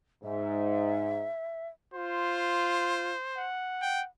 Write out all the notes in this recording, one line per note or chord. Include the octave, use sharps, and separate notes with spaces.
G#2 E5
F4 C5
F#5
G5